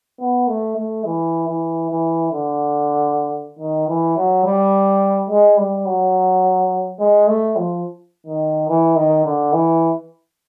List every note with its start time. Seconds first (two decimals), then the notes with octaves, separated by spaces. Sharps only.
0.20 B3
0.48 A3
0.77 A3
1.05 E3
1.48 E3
1.90 E3
2.32 D3
3.59 D#3
3.88 E3
4.17 F#3
4.44 G3
5.30 G#3
5.57 G3
5.86 F#3
6.99 G#3
7.27 A3
7.56 F3
8.27 D#3
8.69 E3
8.96 D#3
9.25 D3
9.53 E3